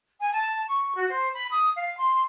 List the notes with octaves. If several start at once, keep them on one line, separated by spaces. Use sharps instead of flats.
G#5
A5
C#6
F#4
C5
B5
D#6
F5
C6